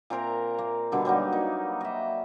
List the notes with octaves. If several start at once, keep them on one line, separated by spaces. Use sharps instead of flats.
A#2 C4 A#4 A#5
A#3
B2 D3 G3
F#3 G3 A#3 D#4
A#3 D#4
D#5 E5